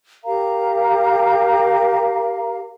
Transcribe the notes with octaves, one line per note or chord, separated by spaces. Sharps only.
G4 A#4 F5 A#5